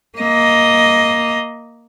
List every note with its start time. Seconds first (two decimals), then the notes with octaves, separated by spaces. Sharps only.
0.18 A#3 D#5